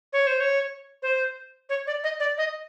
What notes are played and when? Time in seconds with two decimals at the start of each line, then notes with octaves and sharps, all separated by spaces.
0.13 C#5
0.27 C5
0.40 C#5
1.03 C5
1.69 C#5
1.87 D5
2.04 D#5
2.20 D5
2.38 D#5